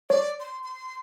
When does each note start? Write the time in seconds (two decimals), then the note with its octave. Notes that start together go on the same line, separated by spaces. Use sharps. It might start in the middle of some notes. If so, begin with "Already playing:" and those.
0.10 C#5 D5
0.40 C6
0.64 C6